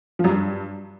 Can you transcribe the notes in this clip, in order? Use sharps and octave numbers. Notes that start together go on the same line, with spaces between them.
F3
F#2
G2